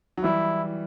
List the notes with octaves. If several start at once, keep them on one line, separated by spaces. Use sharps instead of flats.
F#3
E3 G3 E4